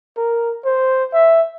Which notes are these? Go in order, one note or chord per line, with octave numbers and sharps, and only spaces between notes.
A#4
C5
E5